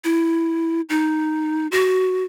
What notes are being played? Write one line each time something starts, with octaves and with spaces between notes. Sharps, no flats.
E4
D#4
F#4